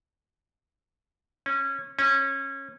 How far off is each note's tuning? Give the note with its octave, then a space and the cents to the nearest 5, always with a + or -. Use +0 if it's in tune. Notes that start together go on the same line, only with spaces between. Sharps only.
C#4 -20
C#4 -25